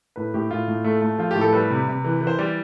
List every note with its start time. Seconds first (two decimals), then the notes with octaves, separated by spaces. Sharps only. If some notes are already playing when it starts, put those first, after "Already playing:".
0.16 A2 B4
0.34 A2 G4
0.51 A2 F4
0.68 A2
0.84 A3
1.02 A3
1.18 F3 F4
1.31 A2 G4
1.41 A4
1.53 G3 B4
1.70 C3
1.88 C3
2.04 E3
2.21 E3
2.27 C5
2.38 G3 D5